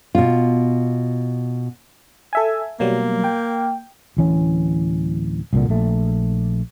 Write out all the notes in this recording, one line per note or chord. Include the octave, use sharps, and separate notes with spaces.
B2 F4
A4 E5 G#5
B2 F#3 G3 A#3
G5
D1 E3 C#4
C2 A#2 D3
A#1 A3